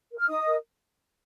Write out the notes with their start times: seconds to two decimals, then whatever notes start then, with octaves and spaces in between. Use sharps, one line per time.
0.12 A#4
0.18 F6
0.29 D#4 D#5 D#6
0.47 A#4